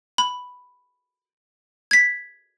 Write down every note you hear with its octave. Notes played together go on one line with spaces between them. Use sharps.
B5
G#6 B6